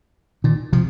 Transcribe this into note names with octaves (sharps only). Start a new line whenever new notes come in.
A#2 D#3
C3 F3